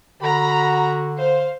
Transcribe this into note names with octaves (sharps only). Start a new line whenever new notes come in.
D3 F#4 A#5 B5
C5 F5